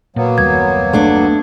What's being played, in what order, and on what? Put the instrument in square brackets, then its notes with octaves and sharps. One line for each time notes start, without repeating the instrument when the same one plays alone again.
[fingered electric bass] A#2 [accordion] F#3 A#3 B3
[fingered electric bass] F#1 D#2 G3 [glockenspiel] G#6
[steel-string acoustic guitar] A3 D4